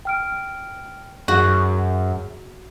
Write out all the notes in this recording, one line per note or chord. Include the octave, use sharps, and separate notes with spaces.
G5 F6 D7
F#2 F#4 G#4